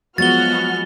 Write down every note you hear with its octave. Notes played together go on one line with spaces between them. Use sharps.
F3 F#3 G#3 B3 F#4 F6 A6 G7